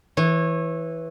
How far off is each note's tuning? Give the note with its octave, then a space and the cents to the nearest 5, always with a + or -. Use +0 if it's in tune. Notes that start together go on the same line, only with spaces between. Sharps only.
E3 -5 C#5 -25